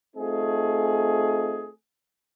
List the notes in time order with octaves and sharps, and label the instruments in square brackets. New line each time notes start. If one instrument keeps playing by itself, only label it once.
[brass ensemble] A3 C4 D#4 F4 G#4